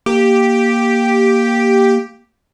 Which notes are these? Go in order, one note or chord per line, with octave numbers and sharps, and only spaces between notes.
A#3 G4